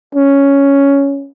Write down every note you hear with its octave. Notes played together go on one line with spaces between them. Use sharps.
C#4